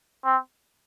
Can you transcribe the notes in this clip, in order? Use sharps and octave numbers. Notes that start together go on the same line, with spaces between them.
C4